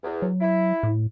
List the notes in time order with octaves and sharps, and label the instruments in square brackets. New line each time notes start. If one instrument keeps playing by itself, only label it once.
[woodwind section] E2
[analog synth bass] F#3
[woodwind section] E4
[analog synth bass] A2